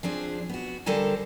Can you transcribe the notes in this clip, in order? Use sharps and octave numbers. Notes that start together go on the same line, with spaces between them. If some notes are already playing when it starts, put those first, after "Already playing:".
F3 C4 D4 G#4
B3 F#4
D3 G3 A4 A#4 C5 G#5